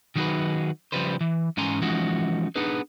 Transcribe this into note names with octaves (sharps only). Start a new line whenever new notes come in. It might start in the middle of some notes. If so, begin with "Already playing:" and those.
D#3 F#3 D#4 F#4 G#4 B4
C#3 F3 G3 B4 C5
E3
G#2 E3 C#4 G#5 A#5 C6
E3 F3 G#3 C#4 D#4 F#4
B3 D4 D#4 G#4 B4